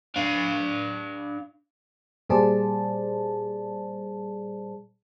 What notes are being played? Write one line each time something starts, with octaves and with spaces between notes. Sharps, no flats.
D4 F5
A#2 G3 G#4 C5 D5 A5